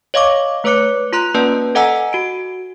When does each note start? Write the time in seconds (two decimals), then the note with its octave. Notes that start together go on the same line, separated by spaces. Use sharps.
0.14 C#5 D#5 F5 C#6 D6
0.64 A3 B4 C#5 D6 F#6 C#7
1.13 F4 A#5 C6 F#6
1.34 A#3 C#4 B4 D5 A5
1.75 A4 D#5 F#5 G#5 A#5 E6
2.13 F#4 D7